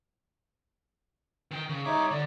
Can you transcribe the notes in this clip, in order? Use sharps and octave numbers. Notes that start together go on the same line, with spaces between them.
D#3 G5
C#3
G3 D#4 C#5 E5 D6
D3 D5